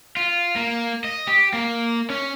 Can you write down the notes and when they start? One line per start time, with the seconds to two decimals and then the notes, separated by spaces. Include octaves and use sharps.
0.17 F4
0.56 A#3
1.04 D#5
1.28 G4
1.53 A#3
2.10 C#4